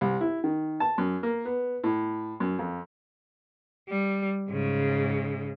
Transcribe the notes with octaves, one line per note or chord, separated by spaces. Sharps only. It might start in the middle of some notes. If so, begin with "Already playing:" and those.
C2
E4
D#3
A5
F#2
A#3
B3
A2
F#2
F2
G3
G#2 C#3